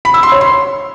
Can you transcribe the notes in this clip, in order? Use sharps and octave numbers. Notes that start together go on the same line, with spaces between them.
B5
E6
C6
C#5
C6